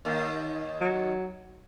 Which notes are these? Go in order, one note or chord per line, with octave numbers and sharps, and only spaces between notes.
D#2 D#3 A#3
F#3